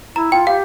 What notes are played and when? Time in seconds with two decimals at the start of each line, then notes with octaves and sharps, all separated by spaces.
0.16 E4 A#5
0.32 F4 G5
0.47 G4 F5